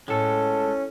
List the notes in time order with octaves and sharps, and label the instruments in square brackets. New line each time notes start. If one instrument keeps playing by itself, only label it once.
[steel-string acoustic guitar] A2 [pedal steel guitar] G#3 A4 [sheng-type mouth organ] C#4